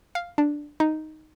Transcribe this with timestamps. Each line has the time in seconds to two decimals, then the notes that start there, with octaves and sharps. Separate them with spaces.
0.15 F5
0.38 D4
0.80 D#4